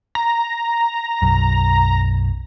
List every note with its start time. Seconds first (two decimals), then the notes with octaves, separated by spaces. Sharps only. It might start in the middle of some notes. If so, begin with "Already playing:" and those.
0.15 A#5
1.22 B1 F#2